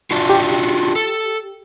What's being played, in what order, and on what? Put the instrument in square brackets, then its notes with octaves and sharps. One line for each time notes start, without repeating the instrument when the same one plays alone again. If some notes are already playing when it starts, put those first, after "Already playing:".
[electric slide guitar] D4 F4 F#4
[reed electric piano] G4
[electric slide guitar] A4